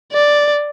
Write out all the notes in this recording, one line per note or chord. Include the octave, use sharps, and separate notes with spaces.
D5